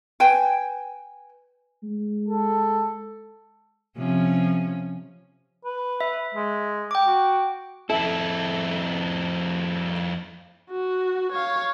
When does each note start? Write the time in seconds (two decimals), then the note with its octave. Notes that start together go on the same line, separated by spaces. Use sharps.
0.20 B4 G5 G#5
1.83 G#3
2.29 A4
3.97 C3 F3 C#4
5.65 B4
6.01 E5
6.34 G#3
6.91 G5 D6
7.07 F#4
7.90 F2 E4 A4 E5
10.71 F#4
11.32 C#5 F5